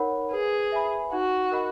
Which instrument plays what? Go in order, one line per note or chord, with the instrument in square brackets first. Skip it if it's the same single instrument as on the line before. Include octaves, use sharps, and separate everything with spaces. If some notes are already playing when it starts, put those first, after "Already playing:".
Already playing: [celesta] D#4 A#4 C#5 F#5 B5
[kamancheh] G#4 [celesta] B4
[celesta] E5 G#5 B5
[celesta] D#4 [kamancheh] F#4
[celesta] A#4 D#5 F#5 B5